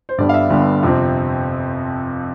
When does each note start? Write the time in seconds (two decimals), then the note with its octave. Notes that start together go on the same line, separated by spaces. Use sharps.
0.09 C5
0.18 G1 G2 D3 G3 B3 D5
0.29 F5
0.34 E5
0.50 G1 G2 D3 G3 B3
0.83 F2 C3 F3 C4